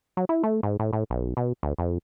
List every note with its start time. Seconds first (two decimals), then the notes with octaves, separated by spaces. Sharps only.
0.17 F#3
0.29 E4
0.43 A3
0.63 G#2
0.79 A2
0.93 A2
1.10 B1
1.37 B2
1.63 D2
1.79 F2